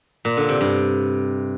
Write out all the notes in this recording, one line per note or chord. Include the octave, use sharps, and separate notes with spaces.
A#2
D3
C3
G2